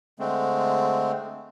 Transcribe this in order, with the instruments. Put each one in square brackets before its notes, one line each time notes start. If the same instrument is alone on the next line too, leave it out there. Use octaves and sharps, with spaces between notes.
[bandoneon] D3 G#3 A3 C4